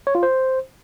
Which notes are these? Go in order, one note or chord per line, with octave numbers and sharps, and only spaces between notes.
C#5
F4
C5